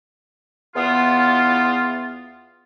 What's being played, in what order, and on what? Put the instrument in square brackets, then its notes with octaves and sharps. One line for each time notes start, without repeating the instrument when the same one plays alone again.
[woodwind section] E2 E3 B3 F4